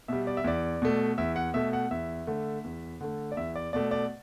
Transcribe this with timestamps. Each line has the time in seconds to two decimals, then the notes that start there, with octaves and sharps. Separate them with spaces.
0.08 B2 G3 E5
0.27 D5
0.37 E5
0.44 E2 D5
0.82 B2 A3
1.18 E2 E5
1.36 F#5
1.54 B2 A3 E5
1.73 F#5
1.91 E2 E5
2.27 D3 A3
2.64 E2
3.01 D3 A3
3.32 D5
3.37 E2 E5
3.56 D5
3.73 B2 A3 D5
3.91 D5